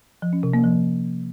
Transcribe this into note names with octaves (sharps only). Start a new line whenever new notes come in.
F3
C#4
C3
A#3
F3